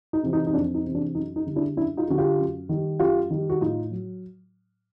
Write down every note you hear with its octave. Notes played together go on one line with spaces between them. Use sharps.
D#4
C3 E3
D#4
D#4
F2 D4
D#4
C3 E3
D4
F#2 D#4
D#4
D3 G3
D4 E4
F#2 D4 E4
D#4 F4
D3 G3 F#4
F4 G4
F#2
D#3 G3
F#2 F4 G4
D#3 G3
F#4
A2 D#4 F4
F#3